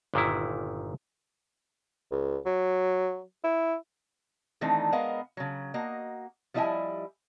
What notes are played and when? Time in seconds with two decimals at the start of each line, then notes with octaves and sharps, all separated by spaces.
0.14 G1 A#2 D#3 E4
2.11 C#2
2.46 F#3
3.44 E4
4.61 D#3 E3 A3 C4 D4 D#4
4.92 G#3 B3 A#4 D#5 F5
5.37 C#3 F#3
5.74 A#3 F#4 D#5
6.54 F3 G3 E4 D#5 E5 G#5